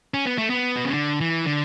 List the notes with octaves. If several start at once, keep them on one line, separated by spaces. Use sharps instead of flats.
C#4
B3
A3
B3
B2
C#3
D3
E3
D3